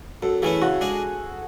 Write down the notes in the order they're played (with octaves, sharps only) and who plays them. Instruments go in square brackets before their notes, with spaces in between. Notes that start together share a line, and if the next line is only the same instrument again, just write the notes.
[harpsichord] F#2 [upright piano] A4
[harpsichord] E3 A3 C#4 E4 [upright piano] G#4
[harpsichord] C#3 [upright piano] F#4
[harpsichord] G#3 D4 G#4